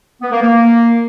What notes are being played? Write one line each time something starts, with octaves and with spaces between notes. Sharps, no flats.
B3
A#3
A#3